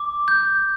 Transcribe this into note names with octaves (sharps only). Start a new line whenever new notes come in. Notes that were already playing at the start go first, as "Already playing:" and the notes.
Already playing: D6
G6